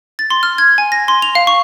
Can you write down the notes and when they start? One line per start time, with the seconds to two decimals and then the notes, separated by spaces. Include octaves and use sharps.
0.19 A6
0.30 C6
0.43 F6
0.58 G#6
0.78 G#5
0.92 A#6
1.08 C6
1.22 F7
1.35 F5
1.47 C#6